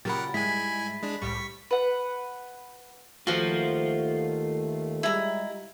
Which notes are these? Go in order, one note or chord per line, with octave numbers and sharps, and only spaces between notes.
A#2 C#3 F#3 G4 A#4 F#5 B5 A6
G#2 G3 G#3 E4 G#5 B6
G#3 D4
C2 A2 G3 C#6 B6
B4 F#5
D#2 D#3 A3 F4 F#4 A#4 C5
G3 G#3 E4 A#5